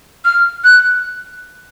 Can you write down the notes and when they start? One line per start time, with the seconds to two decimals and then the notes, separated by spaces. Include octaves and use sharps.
0.25 F6
0.64 F#6